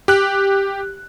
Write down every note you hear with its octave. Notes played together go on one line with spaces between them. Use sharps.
G4 F#6